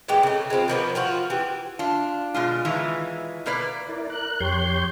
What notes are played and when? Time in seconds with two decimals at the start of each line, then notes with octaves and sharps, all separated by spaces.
0.08 A#2 E3 G#3 G4
0.23 C#3 A3
0.50 G#3 B3 C4 F4
0.68 D#3 F3 A#3 B3
0.95 F3 F4 F#4
1.30 E3 G4
1.79 D4 F4
2.34 B2 G#3 F4
2.65 D#3 E3 G#3 F4
3.46 B2 A#3 B4 D5
3.89 E4 A#4 D5
4.10 A#4 F#6
4.41 F2 G4 C#5 C6 G6